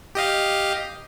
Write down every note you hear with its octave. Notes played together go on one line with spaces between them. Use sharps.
G4 D#5 F5